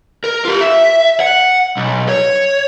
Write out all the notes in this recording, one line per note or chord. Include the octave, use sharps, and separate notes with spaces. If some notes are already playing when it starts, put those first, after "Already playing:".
A#4
F4 G4
E5
F#5
B1
C#5